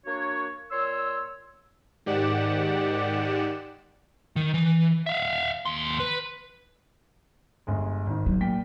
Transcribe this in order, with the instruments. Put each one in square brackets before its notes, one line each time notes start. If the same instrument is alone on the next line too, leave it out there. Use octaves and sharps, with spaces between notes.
[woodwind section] A#3 D4 F#4 C#5
A#2 C#5 C6 E6
[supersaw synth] G#2 D#3 G4 D5 F#5 E7
[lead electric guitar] D#3
E3
E5 F5
D#2 C6
B4
[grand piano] G1 G#3
G#1 D#3
[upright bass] F#3
[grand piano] A#2 G5 B6